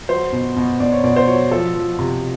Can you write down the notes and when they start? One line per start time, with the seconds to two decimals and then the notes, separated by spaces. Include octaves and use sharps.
0.09 F#3 C5
0.32 B2
0.56 B2
0.80 B2 D5
0.92 C#5
1.04 B2 D5
1.16 C5
1.27 F#3 C#5
1.51 F3 A4
1.75 F3
1.99 C3